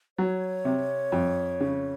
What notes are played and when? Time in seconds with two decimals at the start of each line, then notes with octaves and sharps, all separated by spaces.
0.18 F#3 C#5
0.65 C3
1.12 F2
1.60 C#3